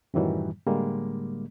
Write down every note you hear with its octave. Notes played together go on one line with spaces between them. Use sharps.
F#2 A2 D#3 E3 F#3 G3
A2 D3 G3 G#3 A#3